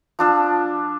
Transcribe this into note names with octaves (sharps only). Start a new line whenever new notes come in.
F3 D4 E6